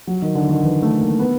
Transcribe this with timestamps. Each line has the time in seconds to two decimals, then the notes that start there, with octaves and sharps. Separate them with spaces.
0.07 F#3
0.22 D#3
0.35 D3
0.49 D#3
0.63 E3
0.82 A3
1.01 A#3
1.19 B3